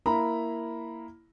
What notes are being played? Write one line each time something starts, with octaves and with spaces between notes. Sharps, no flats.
A#3 E4 A#5 B5